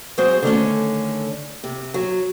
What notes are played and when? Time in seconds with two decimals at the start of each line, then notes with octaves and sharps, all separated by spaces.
0.18 F#3 G#3 C4 F#4 C5 D#5
0.43 D3 D#3 A3 C#4
1.64 C3
1.94 F#3